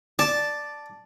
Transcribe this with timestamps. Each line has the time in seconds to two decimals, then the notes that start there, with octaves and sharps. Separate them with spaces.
0.19 D5 A5